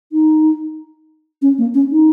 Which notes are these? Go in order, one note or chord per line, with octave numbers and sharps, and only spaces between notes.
D#4
C#4
A#3
C#4
D#4